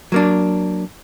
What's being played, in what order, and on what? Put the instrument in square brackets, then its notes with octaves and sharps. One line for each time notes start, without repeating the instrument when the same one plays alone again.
[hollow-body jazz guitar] F#3 A#3 D4